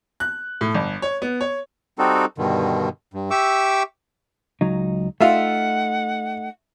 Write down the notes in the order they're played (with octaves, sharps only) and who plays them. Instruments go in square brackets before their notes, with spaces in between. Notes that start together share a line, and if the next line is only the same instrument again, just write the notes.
[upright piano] F#6
A2
G1
C#5
B3
C#5
[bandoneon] G3 C4 D#4 F#4 A4
G2 B2 D3 D#3
G2
G4 E5 C#6 D6 E6
[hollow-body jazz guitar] C#2 F#3 D#4
[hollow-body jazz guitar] A3 D#4 [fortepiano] F4 E5 [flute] F#5